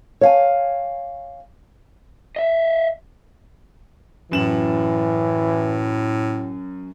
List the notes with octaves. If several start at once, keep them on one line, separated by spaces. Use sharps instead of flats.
C#5 F5 G#5
D#5 E5
F#2 A2 E3 E7 F#7